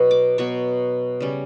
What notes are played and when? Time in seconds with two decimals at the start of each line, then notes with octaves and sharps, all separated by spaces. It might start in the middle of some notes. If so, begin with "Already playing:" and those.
Already playing: B2 F#3 B3
0.11 D6
0.38 B2 F#3 B3 C#6
1.20 C#3 G3 C#4